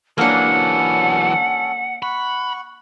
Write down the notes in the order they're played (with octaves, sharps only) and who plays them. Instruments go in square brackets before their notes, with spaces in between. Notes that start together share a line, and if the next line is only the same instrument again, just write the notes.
[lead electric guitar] E3 F#3 [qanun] A#3 D4 [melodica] C#4 A4 [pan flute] F#5
[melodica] F#5 C#6 [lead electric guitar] B5